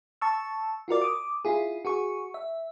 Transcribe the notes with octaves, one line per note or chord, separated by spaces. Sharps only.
A5 C#6 E6
F4 F#4 A#4 D5
D6 D#6
E4 F4 G#4
F#4 G#4 C#6
E5